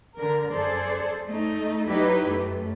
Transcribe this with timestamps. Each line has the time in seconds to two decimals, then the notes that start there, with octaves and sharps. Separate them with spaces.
0.17 D3 A#4
0.52 F#2 G#4 A4 C5 D5
1.27 A3 D#4
1.86 F#3 D#4 E4 G4 B4
2.25 F#2 A3